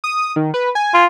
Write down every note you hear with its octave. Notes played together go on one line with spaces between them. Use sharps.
D#6
D#3
B4
G#5
F4